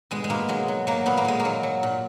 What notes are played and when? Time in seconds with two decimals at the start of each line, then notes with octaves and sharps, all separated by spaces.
0.11 B2 G#3
0.24 G#3
0.30 B2 A#3
0.49 F#3 G#3
0.68 F#3
0.87 F#3 A#3
1.06 A#2 B3
1.17 A#3
1.25 A#2 G#3
1.40 A#3
1.45 F#3
1.63 F#3
1.83 A#2